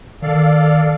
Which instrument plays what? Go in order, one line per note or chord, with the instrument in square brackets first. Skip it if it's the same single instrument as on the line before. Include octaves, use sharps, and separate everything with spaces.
[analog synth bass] D#3 [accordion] A4 D5 F5